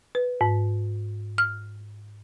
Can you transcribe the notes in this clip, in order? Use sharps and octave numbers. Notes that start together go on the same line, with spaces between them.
B4
G#2
F6